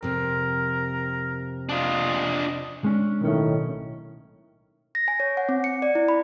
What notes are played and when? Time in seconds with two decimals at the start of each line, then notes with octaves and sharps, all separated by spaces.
0.03 F2 C3 A#4
1.69 D4 F4 D#5
2.84 G#3 C#4 D4
3.21 B1 A2 D#3 C#4
4.95 A#6
5.08 G#5
5.20 C#5
5.37 F#5
5.49 C4
5.64 C#7
5.82 D5
5.95 E4
6.08 B5